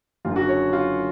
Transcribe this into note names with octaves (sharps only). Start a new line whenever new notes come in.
F#1 F#2 D3 F4
F#4
C#5
F4